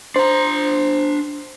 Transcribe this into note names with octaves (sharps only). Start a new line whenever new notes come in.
D4 C5 A#5